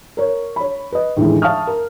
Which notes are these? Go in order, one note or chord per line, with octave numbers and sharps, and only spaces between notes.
A#4 C#5
C#5 B5
B4 D#5
D#2 A2 D3 E3 G#3
E5 F5 A5 C#6 D#6 F6
A#4